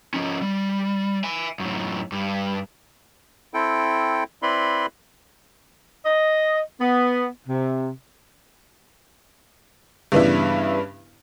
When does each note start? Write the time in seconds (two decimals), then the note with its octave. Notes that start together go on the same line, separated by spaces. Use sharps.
0.14 F3 C#4
0.42 G3
1.24 E5 G#5
1.60 F#2 A2
2.12 G2
3.54 C4 E4 A4 G5
4.42 C4 E4 B4 D5 B5 C6
6.05 D#5
6.81 B3
7.47 C3
10.12 G2 C#3 E3 B3 D4 E4